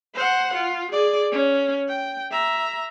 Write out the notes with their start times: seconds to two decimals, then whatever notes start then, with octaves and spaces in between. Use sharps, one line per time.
0.14 C5 F#5
0.54 F4
0.91 G#4 D5
1.32 C#4
1.88 G5
2.31 E5 A#5